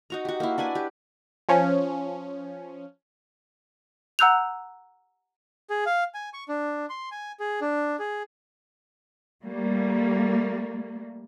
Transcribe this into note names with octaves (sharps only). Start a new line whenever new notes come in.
D#4 F#4 A#5
F#4 G4
A#3 E4
D4 E4 B4 G#5
G4
F3 C#4
F#5 A#5 E6 F#6 G6 F7
G#4
F5
G#5
C#6
D4
C6
G#5
G#4
D4
G#4
G3 A3 A#3